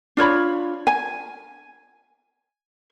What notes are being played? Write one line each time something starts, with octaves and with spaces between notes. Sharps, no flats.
D4 F4 C#5 B5
G#5